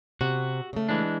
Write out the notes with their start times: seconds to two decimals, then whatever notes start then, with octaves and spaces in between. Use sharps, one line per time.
0.21 C3 F#4
0.73 C#3 A3
0.89 E3 G#3 D4